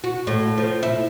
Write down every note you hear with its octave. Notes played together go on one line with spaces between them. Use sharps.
F#4
A2
F3
E4